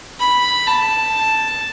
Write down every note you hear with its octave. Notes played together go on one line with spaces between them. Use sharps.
B5
A5